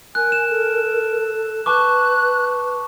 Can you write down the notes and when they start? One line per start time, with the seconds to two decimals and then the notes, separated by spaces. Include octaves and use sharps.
0.15 A#4 G#5 F#6
0.32 E7
0.50 A4
1.66 B4 A5 C#6 D6 F#6